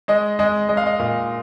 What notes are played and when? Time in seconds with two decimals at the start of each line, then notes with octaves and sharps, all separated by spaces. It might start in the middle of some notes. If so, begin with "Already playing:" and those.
0.08 G#3 D#5
0.39 G#3 D#5
0.69 G#3 D#5
0.77 F5
0.86 D#5
0.99 A#2 F5